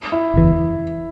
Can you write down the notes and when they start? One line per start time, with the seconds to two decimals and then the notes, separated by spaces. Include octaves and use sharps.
0.12 E4
0.34 F#1 E2 E3